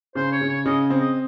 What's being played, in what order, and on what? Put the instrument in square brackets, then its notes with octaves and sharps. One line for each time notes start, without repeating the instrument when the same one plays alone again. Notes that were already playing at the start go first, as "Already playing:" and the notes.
[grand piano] C#3 [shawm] C5
[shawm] C#5
[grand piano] C#3
[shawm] C#5
[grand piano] C#3 [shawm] D#5
[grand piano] C4
[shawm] D#5